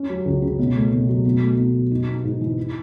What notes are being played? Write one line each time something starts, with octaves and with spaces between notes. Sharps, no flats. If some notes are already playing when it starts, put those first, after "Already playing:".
Already playing: C#4
F#3
C#2
C#3
B2
A3
B2
F#3
B2
A3
B2
F#3
D#4
B3
G#2
E3
E4